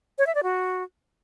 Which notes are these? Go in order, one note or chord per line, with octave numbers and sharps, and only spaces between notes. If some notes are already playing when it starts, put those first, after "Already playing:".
C#5
E5
D5
F#4